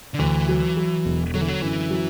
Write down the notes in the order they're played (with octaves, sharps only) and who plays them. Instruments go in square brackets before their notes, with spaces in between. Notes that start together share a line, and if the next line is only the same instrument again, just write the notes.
[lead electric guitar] D3
[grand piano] D2 [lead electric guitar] E3
[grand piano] F#3
F#3
E1
[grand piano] D3 [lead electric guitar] F#3
[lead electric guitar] E3
F#3
[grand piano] F#2 [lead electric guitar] E3
[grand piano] F#3